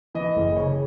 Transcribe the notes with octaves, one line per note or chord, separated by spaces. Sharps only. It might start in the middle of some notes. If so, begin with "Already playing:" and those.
E3 D#5
F#1
C#3 C#5